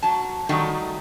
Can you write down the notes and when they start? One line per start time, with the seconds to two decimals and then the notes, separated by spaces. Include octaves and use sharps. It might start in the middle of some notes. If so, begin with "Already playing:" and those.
0.03 F#3 A5
0.49 D#3 F#3 G3 A3 D#4